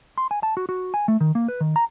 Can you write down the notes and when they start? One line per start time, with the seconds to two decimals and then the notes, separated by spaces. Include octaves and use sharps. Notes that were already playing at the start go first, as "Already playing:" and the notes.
0.18 C6
0.31 G#5
0.43 A5
0.57 F#4
0.69 F#4
0.94 G#5
1.08 A3
1.21 D#3
1.35 A#3
1.48 B4
1.61 D#3
1.76 A#5